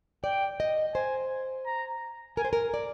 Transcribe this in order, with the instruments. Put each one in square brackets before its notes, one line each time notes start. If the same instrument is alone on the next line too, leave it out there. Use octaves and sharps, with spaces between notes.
[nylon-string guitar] D5 [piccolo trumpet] G5
[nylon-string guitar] D#5
[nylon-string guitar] C5 [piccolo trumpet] G#5
[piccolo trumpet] A#5
[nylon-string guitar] A#4 [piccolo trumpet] G#5
[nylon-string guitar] C5
A#4
D5